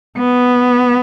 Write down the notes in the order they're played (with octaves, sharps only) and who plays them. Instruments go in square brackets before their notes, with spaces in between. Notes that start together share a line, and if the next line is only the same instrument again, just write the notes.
[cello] B3